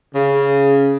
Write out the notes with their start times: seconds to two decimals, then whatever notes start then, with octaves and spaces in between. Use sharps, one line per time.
0.15 C#3